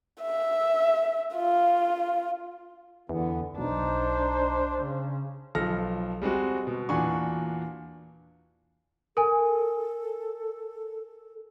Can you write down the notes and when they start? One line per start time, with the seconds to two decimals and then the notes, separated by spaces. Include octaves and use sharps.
0.21 E5
1.35 F4
3.09 E2 D3 E3 B3
3.58 B1 D4 D#4 C5
4.83 C#3
5.55 B1 F3 A4 F6 A#6
6.22 G3 G#3 C4 F#4
6.67 B2
6.89 E2 A#2 D4 F#4 G#5 C#6
9.17 A4 A#4 G#5